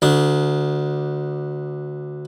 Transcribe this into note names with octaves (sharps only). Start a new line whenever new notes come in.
D2 D4